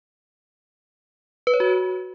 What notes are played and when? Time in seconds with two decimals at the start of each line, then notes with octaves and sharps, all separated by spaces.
1.47 B4
1.54 C#5
1.60 F#4